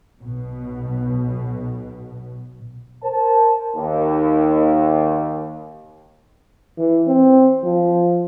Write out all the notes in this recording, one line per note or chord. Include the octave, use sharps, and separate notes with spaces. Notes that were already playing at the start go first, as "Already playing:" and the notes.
B1 B2
A#4 C5 A5
D#2
E3
C4
F3